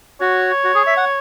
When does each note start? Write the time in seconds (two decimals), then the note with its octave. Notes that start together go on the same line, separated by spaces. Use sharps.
0.21 F#4 C#5
0.64 F#4
0.75 G#4
0.87 E5
0.97 F#5